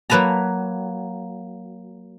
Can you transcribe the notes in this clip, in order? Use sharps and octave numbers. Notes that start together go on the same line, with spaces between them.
F#3 A#3 B4 A5 A#5